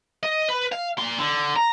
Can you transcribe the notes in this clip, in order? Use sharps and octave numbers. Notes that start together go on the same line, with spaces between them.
D#5
B4
F5
A#2 C6
D3
A#5